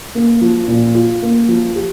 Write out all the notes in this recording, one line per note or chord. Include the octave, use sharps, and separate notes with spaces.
A#3
F3
A#2
F4
A#3
F3
G4